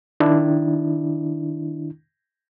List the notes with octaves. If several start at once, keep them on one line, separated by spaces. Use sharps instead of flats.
D#3 D4 E4